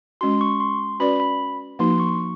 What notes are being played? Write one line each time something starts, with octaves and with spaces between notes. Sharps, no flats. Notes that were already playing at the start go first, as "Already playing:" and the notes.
G#3 C#4 F#4 C6
C#6
C6
C#4 F#4 B4 D5 B5
B5
F3 A#3 D#4 F#4 C6
C#6